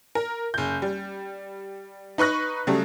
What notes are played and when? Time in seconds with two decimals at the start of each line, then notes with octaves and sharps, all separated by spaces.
0.15 A#4
0.54 F#1 G6
0.82 G3
2.18 D#4 B4 C#6 F#6 A#6
2.67 C#3 F#3 G3 A3